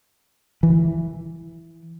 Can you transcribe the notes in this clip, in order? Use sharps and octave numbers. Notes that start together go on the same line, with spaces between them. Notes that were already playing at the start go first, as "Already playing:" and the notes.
E3